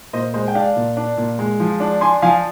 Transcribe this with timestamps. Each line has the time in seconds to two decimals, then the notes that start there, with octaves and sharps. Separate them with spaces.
0.13 A#2 C5 D#5
0.34 G#3 C5 D#5
0.48 G5
0.55 D4 D5 F5
0.76 A#2
0.97 D4
1.17 A#2
1.39 G#3
1.60 F3
1.80 D4
2.01 D4 G#5 C6
2.22 F3 F5 G#5